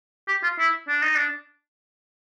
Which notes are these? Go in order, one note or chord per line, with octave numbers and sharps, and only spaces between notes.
G4
F4
E4
D4
D#4
D4